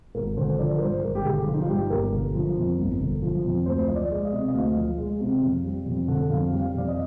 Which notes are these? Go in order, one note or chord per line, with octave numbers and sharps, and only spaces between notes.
G#1 A#4
D3 C5
F3 D5
A#4
G2 C5
G#1 A#4
G4
D3 G#4
F3 F4
D#4
F4
G2 G4
G1 A#4
D3
F3
F2
G1
D3
F3
F2
D2 C5
F3 D#5
D5
G#3
D#5
C3
D#5
D2 F5
F3
G#3
C3
F2
G3
F2
D3
F2 F5
G3
F5
F2 D5
D#5